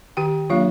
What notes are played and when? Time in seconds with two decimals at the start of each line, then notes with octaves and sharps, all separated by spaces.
0.17 D#3 G4 G5
0.50 F#3 A#3 D4 F4 F5